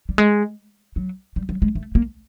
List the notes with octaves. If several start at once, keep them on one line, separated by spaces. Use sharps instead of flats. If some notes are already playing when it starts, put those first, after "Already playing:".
G3
G#3
F#3
G3
F#3
G#3
A3
A#3